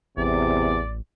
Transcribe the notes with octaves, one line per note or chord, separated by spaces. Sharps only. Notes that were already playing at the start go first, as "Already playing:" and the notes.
A1 E2 C3 D5